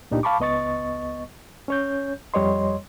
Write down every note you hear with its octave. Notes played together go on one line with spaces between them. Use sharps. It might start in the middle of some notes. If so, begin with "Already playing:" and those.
C#2 A#2 D4 D#4 G4
F5 A5 B5 C#6 D6
C#2 B3 D#5 C#6 A6
C#4 C#5 G6
F2 G3 C#5 D#5 C6